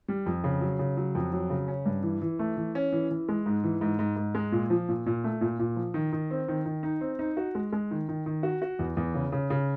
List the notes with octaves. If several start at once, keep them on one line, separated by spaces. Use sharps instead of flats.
G3
F2
C#3
F#3
C#3
F#3
F2
F#3
C#3
C#4
G2
E3
E3
A3
E3
C#4
E3
E3
G#3
G#2
E3
G#2
G#2
G#2
G#3
A#2
F3
A#2
A#2
A3
A#2
A#2
F3
D#3
D#3
C4
D#3
D#3
D#4
C4
D#4
F#4
G#3
G#3
D#3
D#3
D#3
F#4
F#4
E2
E2
C#3
C#3
C#3